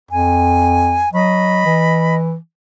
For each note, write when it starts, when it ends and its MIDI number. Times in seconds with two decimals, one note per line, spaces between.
0.11 1.07 41
0.11 1.10 80
1.13 1.65 54
1.13 2.16 75
1.13 2.16 83
1.65 2.36 52